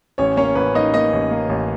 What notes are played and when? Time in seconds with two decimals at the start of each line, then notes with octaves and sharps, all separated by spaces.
0.18 A1 C#4 C#5
0.37 A#3 C#4 C#5
0.55 A1 B4
0.74 A#3 D#4 D#5
0.94 A#3 D#4 D#5
1.13 A1
1.31 A#3
1.49 A1